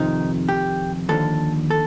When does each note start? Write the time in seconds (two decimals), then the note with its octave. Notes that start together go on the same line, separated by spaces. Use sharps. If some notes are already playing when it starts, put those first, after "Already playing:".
Already playing: F2 C3 D#3 D#4
0.49 G4
1.09 D#2 D3 F3 A4
1.70 A4